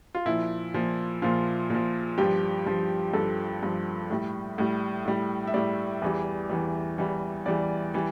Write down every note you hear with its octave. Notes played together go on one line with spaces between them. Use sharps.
F4
A#2 F3 E4
A#2 F3
A#2 F3 F4
A#2 F3
G2 F3 G4
G2 F3
G2 F3 A4
G2 F3
A2 G3
A2 G3
A2 G3
E5
A2 G3 D5
E2 E3 G3
E2 E3 G3
E2 E3 G3
E2 E3 G3 D5
E3 G3